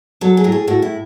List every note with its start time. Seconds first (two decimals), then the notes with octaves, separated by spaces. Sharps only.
0.21 F#3 A4
0.37 G#4
0.44 A2
0.52 G#4
0.67 A2 F#4
0.82 E4